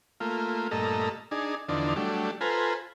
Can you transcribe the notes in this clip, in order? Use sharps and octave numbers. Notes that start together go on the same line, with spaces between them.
A3 A#3 F4
G2 A#2 A3 A4 D#5 A#5
D4 D#4 G#4
E2 D3 F3 D4 D#4
F#3 G3 A3 D4
F4 A4 B4 C5 G#5 A#5